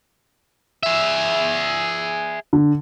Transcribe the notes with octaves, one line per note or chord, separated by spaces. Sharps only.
G#4 E5
D3